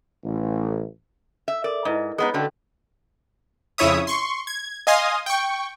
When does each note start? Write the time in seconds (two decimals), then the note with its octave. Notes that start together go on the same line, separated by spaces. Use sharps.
0.23 A1
1.48 E5
1.64 A4 A#4 D5
1.85 G#2 E4 B4 D#5
2.18 G#3 B3 D#4 G#4 B4 C#5
2.34 D3 A3 C#4 F#4 A4
3.78 F2 C#3 E4 C#5 E5 D#6
4.07 C6 C#6
4.47 G#6
4.87 D#5 F5 G#5 C6 D#6
5.26 G5 C#6